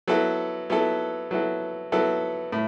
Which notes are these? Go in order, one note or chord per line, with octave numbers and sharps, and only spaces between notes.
F#3 B3 E4 A4
F#3 B3 E4 A4
F#3 B3 E4 A4
F#3 B3 E4 A4
A2